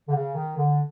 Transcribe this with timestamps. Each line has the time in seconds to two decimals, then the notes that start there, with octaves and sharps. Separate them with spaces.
0.09 D3
0.14 C#3
0.34 D#3
0.57 D3